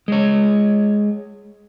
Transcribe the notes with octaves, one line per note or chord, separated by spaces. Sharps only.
G#3 C#5